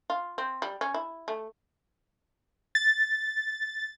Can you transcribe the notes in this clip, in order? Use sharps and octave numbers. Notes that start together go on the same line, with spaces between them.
F4
C4
G3
C#4
E4
A3
A6